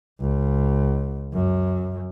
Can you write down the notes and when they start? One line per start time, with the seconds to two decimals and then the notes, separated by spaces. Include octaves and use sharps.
0.20 C#2
1.34 F#2